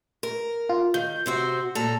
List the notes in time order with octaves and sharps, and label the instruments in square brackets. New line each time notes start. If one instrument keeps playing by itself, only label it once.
[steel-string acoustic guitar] A#4
[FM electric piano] F4
[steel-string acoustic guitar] D#3 [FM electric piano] G6
[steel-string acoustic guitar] C3 C4 F#4
A#2 A4 A#5